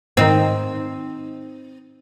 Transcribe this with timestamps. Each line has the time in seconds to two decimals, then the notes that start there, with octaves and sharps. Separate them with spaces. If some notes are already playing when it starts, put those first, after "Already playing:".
0.17 G#2 D#3 C4 D#4